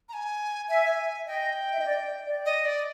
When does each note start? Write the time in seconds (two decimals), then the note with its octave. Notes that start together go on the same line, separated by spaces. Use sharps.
0.09 A#5
0.13 G#5
0.68 E5 G#5
1.27 D#5 G5
1.72 E5
1.79 D#5
1.86 D5
2.26 D5
2.45 D#5
2.66 D5